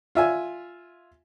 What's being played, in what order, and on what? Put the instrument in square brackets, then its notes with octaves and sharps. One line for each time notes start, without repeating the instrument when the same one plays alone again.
[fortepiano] F4 E5 G#5